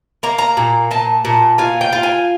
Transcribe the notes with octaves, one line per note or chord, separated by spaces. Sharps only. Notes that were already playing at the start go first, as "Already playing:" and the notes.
A#3 A#5
A#5
A#2
A#2 A5
A#2
F4 G#5
G5
F4
G#5